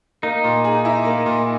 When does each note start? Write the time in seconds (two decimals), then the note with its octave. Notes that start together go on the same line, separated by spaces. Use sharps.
0.23 A#3 D#4
0.44 A#2
0.64 G#4
0.85 E4
1.05 A#3
1.26 A#2